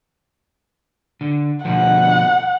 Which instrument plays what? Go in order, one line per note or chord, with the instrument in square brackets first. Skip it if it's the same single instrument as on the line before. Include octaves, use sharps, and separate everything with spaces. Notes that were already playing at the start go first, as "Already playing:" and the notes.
[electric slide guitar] D3
[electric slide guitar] B2 D3 F3 [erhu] F#5